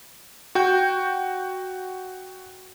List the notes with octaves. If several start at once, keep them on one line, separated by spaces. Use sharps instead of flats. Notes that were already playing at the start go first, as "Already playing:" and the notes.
F#4 G5 G6